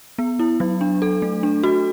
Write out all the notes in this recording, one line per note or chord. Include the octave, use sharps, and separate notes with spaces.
B3
E4
F#3
D4
A4
A3
D4
F#4